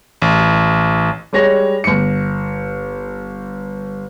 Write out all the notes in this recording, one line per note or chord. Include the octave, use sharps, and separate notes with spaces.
A1
G3 G#3 C#5 A#6
G1 C#7